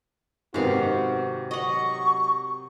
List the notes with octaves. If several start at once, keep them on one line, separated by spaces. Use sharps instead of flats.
G#2 C3 D#3 B3 F#4 F5
F#3 D#5 F#5 C#6